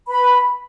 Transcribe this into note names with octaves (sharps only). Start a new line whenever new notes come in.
B4 B5